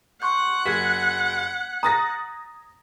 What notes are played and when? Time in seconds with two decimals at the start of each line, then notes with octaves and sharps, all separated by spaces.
0.22 F#5 C6 C#6 G6
0.66 F#1 G#6 B6
1.83 A#5 D#6 A6 A#6